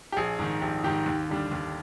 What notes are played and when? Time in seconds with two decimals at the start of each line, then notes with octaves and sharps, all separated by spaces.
0.12 G4
0.16 A#1 G#4
0.39 G#2 D#3
0.61 A#1 G4
0.84 G#2 D#3 G4
1.06 D#2
1.29 D3 G3 D4
1.51 D#2